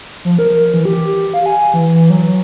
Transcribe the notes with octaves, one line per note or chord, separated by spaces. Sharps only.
F3
A#4
E3
G4
F5
G#5
E3
F#3